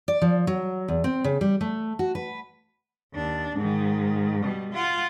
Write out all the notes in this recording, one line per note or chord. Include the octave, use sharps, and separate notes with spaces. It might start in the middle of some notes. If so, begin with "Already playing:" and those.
D5
F3
F#3
E2
C4
C#3
G3
A3
F#4
B4
D#2 D4
G#2 D#3
B2 G3
F4 F#5